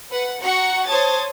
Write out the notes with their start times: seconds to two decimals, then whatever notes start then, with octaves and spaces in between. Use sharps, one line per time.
0.11 B4 F#5
0.42 F#4 F#5 A#5 C#6 C#7
0.88 C5 C#5 A5 D#6 G#6 A6